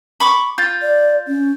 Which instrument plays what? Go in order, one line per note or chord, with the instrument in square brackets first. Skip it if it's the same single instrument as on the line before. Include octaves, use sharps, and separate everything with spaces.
[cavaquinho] B5 C#6 D6
[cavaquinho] F4 [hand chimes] G6 A6
[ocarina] D5
C#4